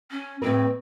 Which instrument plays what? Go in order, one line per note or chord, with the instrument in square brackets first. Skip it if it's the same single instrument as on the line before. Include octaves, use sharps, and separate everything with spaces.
[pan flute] C#4
[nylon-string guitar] A2 G#3 B4 [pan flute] C4